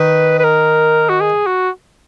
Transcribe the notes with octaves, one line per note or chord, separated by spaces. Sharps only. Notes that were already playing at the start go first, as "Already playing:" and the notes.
Already playing: D#3 B4
B4
A#4
F#4
G#4
F#4